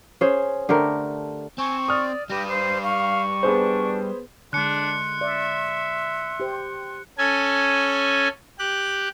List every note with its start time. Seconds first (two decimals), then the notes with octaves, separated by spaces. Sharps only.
0.21 C#4 G#4 C5
0.69 D3 A3 G4 A#4
1.58 C4 G#5 C#6
1.88 D5 D#6 F6
2.30 G3 G4 B4 A#6
2.49 C5 C7
2.83 F5 C#6
3.43 B3 D4 G#4 C5
4.53 D3 G#3 D4 C6 F#6 C#7
5.21 D5 E5
6.40 G4 C5
7.18 C#4 A4 G#5
8.59 G4 F#6